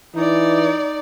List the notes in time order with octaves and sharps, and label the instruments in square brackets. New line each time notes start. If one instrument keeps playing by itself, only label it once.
[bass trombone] E3 [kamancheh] D#4 D5